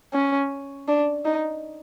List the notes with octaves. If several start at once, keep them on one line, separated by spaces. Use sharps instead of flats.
C#4
D4
D#4